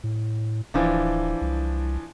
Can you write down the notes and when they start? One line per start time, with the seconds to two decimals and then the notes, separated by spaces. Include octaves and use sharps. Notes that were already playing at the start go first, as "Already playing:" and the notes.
0.04 A2
0.74 D1 E3 F3 D4
1.41 C2